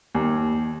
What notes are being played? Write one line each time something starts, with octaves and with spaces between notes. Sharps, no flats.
D#2